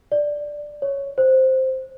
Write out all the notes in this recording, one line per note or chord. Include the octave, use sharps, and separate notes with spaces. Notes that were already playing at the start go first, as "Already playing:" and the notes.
D5
C#5
C5